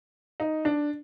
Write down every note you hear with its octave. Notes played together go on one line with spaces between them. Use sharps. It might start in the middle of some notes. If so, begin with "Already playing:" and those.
D#4
D4